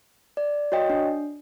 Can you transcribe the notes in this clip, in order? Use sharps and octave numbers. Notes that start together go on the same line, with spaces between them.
D5
F#4 C#5 D#5 G5
D4